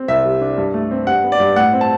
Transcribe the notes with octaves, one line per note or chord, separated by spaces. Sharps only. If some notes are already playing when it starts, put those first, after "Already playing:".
Already playing: C4
C2 E5
G3
D4
G2
A3
C4
G2 F#5
B3
D5
G2
A2 F#5
C4
A5